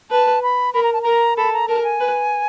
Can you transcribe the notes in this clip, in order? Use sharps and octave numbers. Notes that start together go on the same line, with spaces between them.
B4 A5
B5
A#4 B5
A#5
A5
A#4 A#5
A4 B5
A#5
A#4 A5
G#5
B4